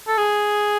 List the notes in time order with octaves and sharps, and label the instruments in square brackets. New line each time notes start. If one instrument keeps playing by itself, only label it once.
[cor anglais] A4
G#4